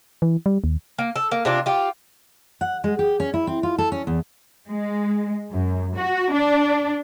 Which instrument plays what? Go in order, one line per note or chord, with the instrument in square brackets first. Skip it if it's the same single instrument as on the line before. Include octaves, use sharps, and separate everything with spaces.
[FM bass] E3
G3
D#2
[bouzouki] A#3
A4
A#3
C3 D4 F4
F4 G4
[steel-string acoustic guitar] F#5
G#3
G4
C#4
E4
C4
F4
A4
C#4
E2
[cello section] G#3
F#2
F#4
D4